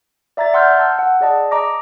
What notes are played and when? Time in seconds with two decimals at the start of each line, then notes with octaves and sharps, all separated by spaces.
0.37 D5 E5 A#5 G#6 A6
0.54 F#5 C6 E6 F6 G6
0.79 A5 E6
0.99 F#5
1.21 G#4 D5 D#5 A5
1.51 D#5 A#5 D6 A#6